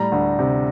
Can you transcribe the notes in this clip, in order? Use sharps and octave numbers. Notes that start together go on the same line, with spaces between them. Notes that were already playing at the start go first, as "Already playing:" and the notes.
Already playing: A2 G3 A#5
D2
C3